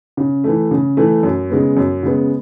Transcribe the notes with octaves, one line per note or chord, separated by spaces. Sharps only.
C#3
E3 A3
C#3
E3 A3
F#2
C#3 G#3 B3
F#2
C#3 G#3 B3